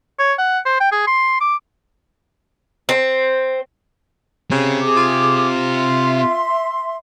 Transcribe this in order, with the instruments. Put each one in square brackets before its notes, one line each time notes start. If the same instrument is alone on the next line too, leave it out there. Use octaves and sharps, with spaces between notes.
[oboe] C#5
F#5
C5
G5
G#4
C6
D6
[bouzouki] C4
[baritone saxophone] C#3 [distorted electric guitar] C4 G4
[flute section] G#4 D6
[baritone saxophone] F4
[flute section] E5 C6